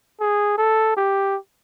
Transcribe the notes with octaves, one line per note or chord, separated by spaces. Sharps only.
G#4
A4
G4